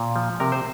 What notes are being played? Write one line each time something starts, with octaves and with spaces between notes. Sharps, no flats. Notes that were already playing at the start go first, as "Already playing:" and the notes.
Already playing: A#2
F3
C3 A#4
C5